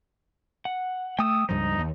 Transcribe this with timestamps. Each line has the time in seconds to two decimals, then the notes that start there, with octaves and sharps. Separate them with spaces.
0.65 F#5
1.19 A3 G5 D#6 E6
1.49 C#2 G2 F3 D#4
1.79 D#2